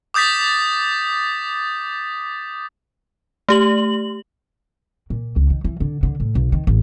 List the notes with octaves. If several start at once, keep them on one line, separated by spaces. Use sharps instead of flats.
D6 D#6 G6 A6 B6
A3 G4 F#7
A#2
C#2
D#3
E3
D3
D3
A2
B1
D#3
A1